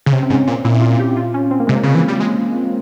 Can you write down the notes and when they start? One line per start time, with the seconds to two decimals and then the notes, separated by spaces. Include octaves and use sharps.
0.06 C#3
0.13 C3 C#4
0.23 C4
0.30 G#2
0.33 C#4
0.47 A#2
0.64 A#2 E4
0.82 F4
1.00 G4
1.17 F4
1.34 C#4
1.51 C4
1.60 A#3
1.67 C3 G#3
1.76 A#3
1.83 C#3
1.95 E3
2.08 G3
2.20 G#3